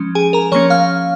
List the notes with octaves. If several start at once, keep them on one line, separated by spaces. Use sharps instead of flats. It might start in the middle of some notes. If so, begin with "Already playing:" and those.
Already playing: F3 G#3 C#4
G#4 G#5
A#4 A#5
F3 A#3 C#4 C#5 C#6
F5 F6